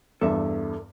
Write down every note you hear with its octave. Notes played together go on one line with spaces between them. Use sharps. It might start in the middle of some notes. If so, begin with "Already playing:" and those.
E2 G2 A4 A#4 E5